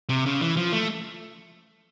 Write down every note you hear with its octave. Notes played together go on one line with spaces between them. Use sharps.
C3
C#3
E3
F3
A3